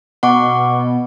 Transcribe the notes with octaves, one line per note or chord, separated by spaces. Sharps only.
B2 F#5 C#6 D6